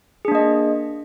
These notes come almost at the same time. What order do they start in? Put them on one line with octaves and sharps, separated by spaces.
G#4 D4 A#3 D#5